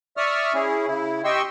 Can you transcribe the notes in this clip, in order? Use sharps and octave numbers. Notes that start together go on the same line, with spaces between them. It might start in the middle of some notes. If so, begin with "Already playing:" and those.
D5 E5 C#6 D#6 F6
C#4 E4 G#4
C#3 E4
G4 D#5 G5 C6 C#6 E6